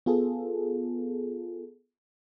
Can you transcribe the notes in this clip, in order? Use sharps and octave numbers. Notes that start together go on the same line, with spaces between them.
B3 F4 G#4 A4